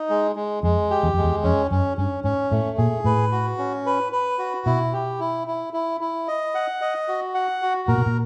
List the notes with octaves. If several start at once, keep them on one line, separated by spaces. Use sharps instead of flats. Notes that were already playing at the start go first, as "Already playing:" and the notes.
Already playing: D#4
G#3
G#3
F2 G#3
G4
E2
F2 G#3
E2
F2 C#4
F#2 C#4
G2 C#4
G#2 C#4
A2 A3
A#2 G#4
A2 B4
F#4
C#4
B4
B4
F#4
B2 E4
G4
E4
E4
E4
E4
D#5
F#5
D#5
F#4
F#5
F#4
A#2 A#4
B2
A#2